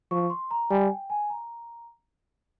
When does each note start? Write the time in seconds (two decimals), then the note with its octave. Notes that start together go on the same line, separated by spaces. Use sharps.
0.11 F3 C#6
0.30 C6
0.51 A#5
0.70 G3 G#5
0.91 G5
1.10 G#5
1.30 A#5